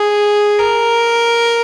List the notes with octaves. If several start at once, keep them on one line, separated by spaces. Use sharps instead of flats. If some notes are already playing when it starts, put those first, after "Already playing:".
Already playing: G#4
A#4